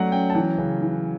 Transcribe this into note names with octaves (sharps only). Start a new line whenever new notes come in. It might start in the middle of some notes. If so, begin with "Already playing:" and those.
Already playing: F#3 A3 C#4 D5 F#5
C#4 G5
A5
E3 G5
C#3
E3